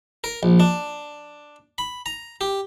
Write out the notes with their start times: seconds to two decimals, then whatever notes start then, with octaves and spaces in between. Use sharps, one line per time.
0.24 A#4
0.43 A#1
0.60 D4
1.78 B5
2.06 A#5
2.41 G4